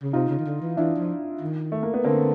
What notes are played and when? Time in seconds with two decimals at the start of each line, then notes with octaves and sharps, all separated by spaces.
0.02 C#3
0.13 C3 D#4 F4
0.29 C#3
0.39 D#3
0.45 D3
0.61 E3
0.77 E3 D4 E4
0.98 F3
1.41 D#3
1.72 A3
1.83 A#3
1.94 B3
2.04 D3 A#3 C4